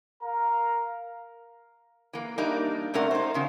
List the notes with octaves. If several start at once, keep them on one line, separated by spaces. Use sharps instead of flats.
A#4 F5 A#5
E3 A#3
G3 A#3 D4 D#4
C3 A3 C#4 A#4 D5 F#5
D#4 C5
E2 C#3 F3